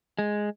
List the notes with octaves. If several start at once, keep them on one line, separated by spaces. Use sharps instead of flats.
G#3